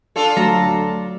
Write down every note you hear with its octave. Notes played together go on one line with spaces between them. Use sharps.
D4 F4 A4
D2 F#3 A3 A#5